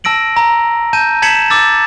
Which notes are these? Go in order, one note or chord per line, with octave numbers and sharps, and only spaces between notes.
A5 E6 A#6 D7 F#7
A#5
A5 G6 D#7
A5 G#6 B6 C#7 E7 F#7
D6 E6 A6